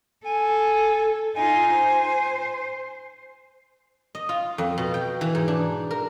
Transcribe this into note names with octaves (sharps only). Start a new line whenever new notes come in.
A4 G#5
D#4 F4 G#5
C5
D#5
F4
F2
B2
G5
E3
G#2
D4
A#4